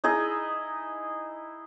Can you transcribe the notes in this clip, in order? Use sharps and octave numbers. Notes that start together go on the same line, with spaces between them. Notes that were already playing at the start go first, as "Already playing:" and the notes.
D#4 E4 G#4 D#5